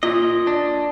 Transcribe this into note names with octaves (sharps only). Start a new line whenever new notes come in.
A#2 D#5
D4